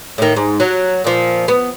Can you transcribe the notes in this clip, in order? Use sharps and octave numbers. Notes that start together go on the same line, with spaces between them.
A2 D#3
G#2
F#3
A#2 F3
B3